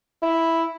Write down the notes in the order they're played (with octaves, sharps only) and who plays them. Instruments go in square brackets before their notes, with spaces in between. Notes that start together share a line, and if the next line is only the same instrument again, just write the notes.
[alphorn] E4